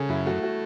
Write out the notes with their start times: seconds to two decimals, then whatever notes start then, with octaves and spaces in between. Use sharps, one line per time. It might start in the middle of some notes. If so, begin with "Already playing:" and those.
Already playing: C#3 G#4 A4
0.09 F#2 E4
0.26 A3 F#4
0.43 F#4